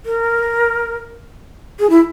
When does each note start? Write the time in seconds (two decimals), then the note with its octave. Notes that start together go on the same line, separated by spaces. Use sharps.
0.06 A#4
1.79 G#4
1.90 E4